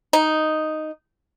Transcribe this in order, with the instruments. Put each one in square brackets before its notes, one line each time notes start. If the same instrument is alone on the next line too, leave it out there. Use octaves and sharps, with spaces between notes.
[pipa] D#4